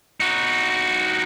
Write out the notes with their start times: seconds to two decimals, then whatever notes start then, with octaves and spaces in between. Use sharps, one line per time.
0.20 D#4 F#4